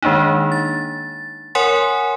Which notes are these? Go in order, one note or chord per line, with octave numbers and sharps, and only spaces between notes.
D#3 G#3 A#3 D4 D#4
A6
A#4 C#5 F#5 G#5 C6